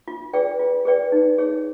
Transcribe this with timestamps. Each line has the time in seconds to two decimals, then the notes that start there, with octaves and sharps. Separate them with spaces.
0.08 F4
0.33 G#4 B4 D5 G5
0.59 F4
0.85 G#4 B4 D5 G5
1.12 D#4
1.38 G#4 C#5